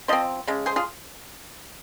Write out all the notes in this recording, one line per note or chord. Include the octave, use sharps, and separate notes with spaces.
F3 C4 C5 D#5
C#3 G#3
G#4 C5
F4 G#4